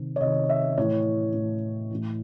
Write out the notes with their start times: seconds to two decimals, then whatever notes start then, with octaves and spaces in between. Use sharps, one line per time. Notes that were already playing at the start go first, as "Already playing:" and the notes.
Already playing: C3 D#3
0.16 C#5
0.21 C3 D#5
0.24 D#3
0.49 E5
0.77 A2 E3 C#5
1.34 A2 E3
1.91 A2 E3